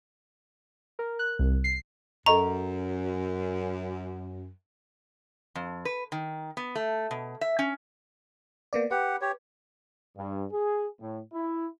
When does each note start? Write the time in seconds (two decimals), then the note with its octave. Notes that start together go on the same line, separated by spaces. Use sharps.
0.99 A#4
1.19 F#6
1.39 C2
1.64 C7
2.26 F#2 A4 D#5 A#5 C#6
5.55 F2
5.85 B4
6.12 D#3
6.57 B3
6.75 A3
7.11 B2
7.41 E5
7.59 C#4
8.73 A#3 B3 D5
8.91 G4 B4 F#5
9.21 G4 C#5
10.16 G2
10.52 G#4
11.00 A2
11.34 E4